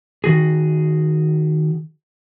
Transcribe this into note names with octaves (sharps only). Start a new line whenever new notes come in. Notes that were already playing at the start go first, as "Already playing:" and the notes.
D#3 F#4 G#4